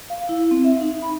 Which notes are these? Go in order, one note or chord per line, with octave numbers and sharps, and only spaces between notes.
F5
E4
C4
E5
D#4
B5